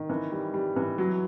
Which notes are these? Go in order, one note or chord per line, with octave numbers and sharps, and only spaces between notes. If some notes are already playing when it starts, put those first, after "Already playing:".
Already playing: D#3
E3
G3
G3
E3
F#3